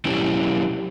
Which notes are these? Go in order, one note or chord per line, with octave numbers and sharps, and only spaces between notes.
F#3 C#4 E4 G4